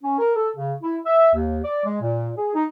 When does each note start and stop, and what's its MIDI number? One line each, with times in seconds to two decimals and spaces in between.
0.02 0.18 61
0.18 0.31 70
0.35 0.49 69
0.56 0.72 49
0.82 0.97 64
1.05 1.31 76
1.33 1.57 39
1.64 1.85 74
1.85 2.01 56
2.02 2.30 46
2.37 2.52 68
2.54 2.63 63